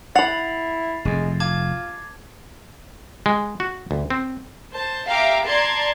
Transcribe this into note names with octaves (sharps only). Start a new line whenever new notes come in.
E4 F#5 B5 A6 C7 F7
F1 F2 G#3
F4 A5 D6 G#6
G#3
F#4
D2
C4
C5 A5
G4 E5 F5 A#5 D6
D5 A5 A#5 C6 G#6